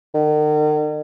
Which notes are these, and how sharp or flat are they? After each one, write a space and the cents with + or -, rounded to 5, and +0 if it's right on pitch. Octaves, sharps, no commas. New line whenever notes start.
D#3 -45